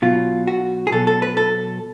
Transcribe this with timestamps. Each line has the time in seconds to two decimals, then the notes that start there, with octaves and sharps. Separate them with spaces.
0.02 B2 F#3 F4
0.47 F#4
0.87 G#4
0.92 B2 F#3 A4
1.07 A4
1.22 B4
1.37 A4